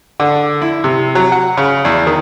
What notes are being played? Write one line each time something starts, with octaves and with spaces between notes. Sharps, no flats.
D3
E4
C3
F#3
F#5
C#3
E2
D#3